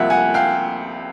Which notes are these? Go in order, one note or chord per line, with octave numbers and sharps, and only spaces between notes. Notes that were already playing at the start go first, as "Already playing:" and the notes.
Already playing: C2 C3 F3 A#3 E5 F#5
F#5 G#5
F5 G5